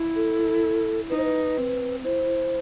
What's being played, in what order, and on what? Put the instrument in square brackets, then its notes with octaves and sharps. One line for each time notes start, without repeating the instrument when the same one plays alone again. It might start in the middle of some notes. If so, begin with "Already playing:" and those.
Already playing: [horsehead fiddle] E4
[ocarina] A4
[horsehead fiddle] D#4 [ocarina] B4
[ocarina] C5
B4
[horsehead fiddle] C4
[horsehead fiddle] E4 [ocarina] C5